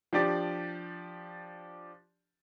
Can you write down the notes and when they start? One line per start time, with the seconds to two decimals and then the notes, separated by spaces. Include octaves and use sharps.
0.13 F3 D4 G4 D5